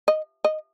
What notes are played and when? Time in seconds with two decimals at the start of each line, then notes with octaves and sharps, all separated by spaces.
0.08 D#5
0.45 D#5